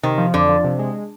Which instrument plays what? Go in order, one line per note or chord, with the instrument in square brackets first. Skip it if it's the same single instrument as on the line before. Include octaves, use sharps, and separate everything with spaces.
[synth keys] C3 [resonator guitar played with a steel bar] D#3
[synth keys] F3
[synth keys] F2 [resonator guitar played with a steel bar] D3
[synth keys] F3
C3
G#3